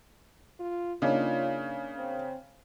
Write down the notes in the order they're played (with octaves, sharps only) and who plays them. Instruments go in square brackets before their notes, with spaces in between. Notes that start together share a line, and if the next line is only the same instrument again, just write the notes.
[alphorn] F4
[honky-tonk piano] C#3 [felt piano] A#3 D4 D#4 [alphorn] F4
[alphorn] C4